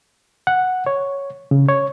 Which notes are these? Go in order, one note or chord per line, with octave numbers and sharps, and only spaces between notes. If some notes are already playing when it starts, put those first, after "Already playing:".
F#5
C#5
C#3
C#5